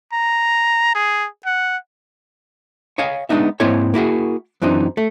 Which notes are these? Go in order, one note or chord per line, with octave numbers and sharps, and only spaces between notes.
A#5
G#4
F#5
C#5 D#5 F5 G#5
G#3 B3 D4 D#4 E5
G#2 A#3 C4 E4 C#5 G#5
A#3 E4 F#4 G#4
F#2 E3 C4 D4 D#4
A3